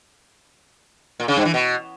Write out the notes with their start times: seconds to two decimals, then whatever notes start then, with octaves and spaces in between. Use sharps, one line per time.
1.20 A#2
1.28 C#3
1.37 G2
1.45 E3
1.54 B2